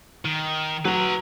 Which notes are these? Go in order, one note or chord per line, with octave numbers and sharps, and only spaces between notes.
D#3
F#3 B4 A#5